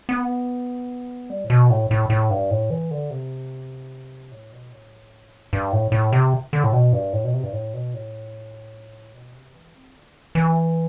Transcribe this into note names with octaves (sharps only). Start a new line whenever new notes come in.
B3
G3
A2
B2
A2
A2
A2
G2
A2
E3
D3
C3
A2
B2
A2
G2
A2
A2
C3
D3
A2
B2
G2
A2
B2
C3
G2
A2
B2
A2
B2
C3
E3
C4
D3
E3